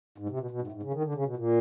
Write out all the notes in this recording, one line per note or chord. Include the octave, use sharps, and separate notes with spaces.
G#2
C3
B2
B2
G#2
A2
G#2
C#3
D#3
D3
C#3
B2
A#2